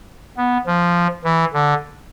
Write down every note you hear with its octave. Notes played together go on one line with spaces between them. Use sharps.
B3
F3
E3
D3